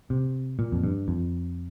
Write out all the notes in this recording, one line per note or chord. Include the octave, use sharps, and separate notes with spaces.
C3
A#2
F2
G2
F2